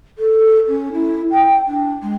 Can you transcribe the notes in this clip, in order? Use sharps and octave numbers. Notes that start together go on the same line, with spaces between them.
A4
C#4
E4
G5
D4
G#3